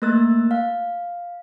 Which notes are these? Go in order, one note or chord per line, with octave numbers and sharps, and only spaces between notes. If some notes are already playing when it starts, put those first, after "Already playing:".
A3 A#3 A#4 E6 F#6 A6
F5